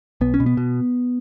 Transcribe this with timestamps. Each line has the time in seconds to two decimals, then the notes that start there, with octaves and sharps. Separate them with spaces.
0.21 B1 B3
0.34 C#4
0.40 B2
0.46 B3
0.57 B2